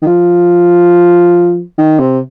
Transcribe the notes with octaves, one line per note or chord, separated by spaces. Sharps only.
D#3
F3
D#3
C3